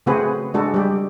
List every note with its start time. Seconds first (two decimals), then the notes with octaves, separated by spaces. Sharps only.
0.06 C#3 A3 C4 F#4 G#4 B4
0.54 G#3 D4 F#4 A4
0.74 G3 G4